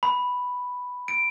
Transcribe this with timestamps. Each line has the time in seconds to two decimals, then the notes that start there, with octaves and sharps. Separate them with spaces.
0.03 B5
1.08 D7